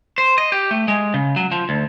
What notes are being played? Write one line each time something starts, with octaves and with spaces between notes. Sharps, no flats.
C5
D#5
G4
A3
G#3
C#3
F#3
F3
D2